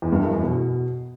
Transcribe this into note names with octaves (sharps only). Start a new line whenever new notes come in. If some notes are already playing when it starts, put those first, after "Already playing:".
E2
G2
F#2
E2
B2